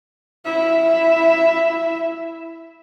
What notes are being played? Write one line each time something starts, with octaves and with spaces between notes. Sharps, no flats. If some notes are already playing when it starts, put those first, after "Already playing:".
E4 E5